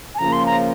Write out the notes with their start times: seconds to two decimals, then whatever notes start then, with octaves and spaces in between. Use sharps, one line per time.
0.15 G#5
0.18 C#3 F3 A#3 A#5
0.32 C6
0.46 A#5